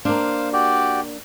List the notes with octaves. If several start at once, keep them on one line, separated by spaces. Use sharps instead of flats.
A#3 D4 C5 F5
F#4 G4 D5